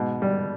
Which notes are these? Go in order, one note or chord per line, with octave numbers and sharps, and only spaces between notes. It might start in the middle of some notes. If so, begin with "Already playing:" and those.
Already playing: G#2 B2
G3